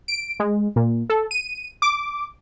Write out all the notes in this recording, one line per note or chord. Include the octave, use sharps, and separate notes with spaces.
D7
G#3
A#2
A4
D#7
D6